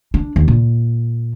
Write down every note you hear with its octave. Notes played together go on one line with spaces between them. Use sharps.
D4
D#2
A#2